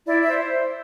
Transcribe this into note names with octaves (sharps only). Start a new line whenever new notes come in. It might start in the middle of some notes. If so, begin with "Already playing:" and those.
E4 D5
E5
C5